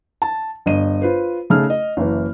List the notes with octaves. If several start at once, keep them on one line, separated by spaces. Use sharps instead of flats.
A5
G1 D#5 D#7
F4 B4 C5
C#3 A3 D#4 G#4 F6
D#5
F#1 E3